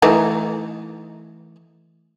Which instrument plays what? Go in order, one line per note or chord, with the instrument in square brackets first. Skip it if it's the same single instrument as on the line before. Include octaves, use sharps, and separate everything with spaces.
[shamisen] E3 A3 D#4